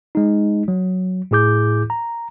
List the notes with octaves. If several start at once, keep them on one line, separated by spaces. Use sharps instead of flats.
G#3 D#4
F#3
A2 E4 G#4 D6 G6
A#5